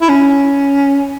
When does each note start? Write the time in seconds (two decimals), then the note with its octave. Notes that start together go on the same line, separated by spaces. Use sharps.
0.02 E4
0.09 C#4